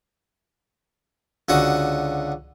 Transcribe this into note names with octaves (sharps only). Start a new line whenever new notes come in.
C#2 D3 F#4 D#6